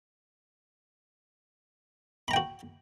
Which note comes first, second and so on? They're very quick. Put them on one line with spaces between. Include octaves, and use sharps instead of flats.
B5 A#5 G5 F#4